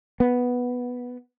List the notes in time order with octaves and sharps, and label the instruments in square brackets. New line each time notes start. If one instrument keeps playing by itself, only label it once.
[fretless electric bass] B3